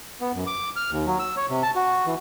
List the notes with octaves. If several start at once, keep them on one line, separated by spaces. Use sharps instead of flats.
B3
F#2
D6
F6
D#2
F#3
E6
C#5
C3
A5
F#4
E3